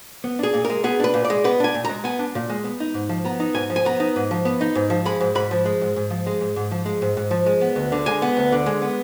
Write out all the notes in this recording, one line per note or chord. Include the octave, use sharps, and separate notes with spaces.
B3
D4 G#4
A#2
A#4
G#3
B3 G#4
D4 B4
A#2
D5
G#3
B3 B4
D4 G#5
A#2
G#3 A#5
B3 G#5
D4
A#2
G#3
B3
D#4
G#2
F3
B3 A#5
D#4
G#2 G#5
F3
G#5
B3 A#5
D#4
G#2
F3
B3
D#4
G#2
F3
G#3 B5
G#2
G#2 B5
F3
G#3
G#2
G#2
F3
G#3
G#2
G#2
F3
G#3
G#2
G#2
F3
G#3
B3
D2
D3
G#3 G#5
B3
D2
D3
G#3
B3